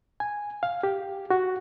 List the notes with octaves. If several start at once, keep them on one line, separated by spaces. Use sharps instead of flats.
G#5
F5
G4
F#4